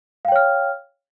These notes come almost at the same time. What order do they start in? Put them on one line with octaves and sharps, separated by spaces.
F5 G5 C#5 F6